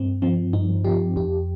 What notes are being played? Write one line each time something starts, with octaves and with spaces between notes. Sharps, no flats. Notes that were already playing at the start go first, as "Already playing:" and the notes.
Already playing: G2 C4
F3 C4
G2 D#4
F3 G4
F2 G4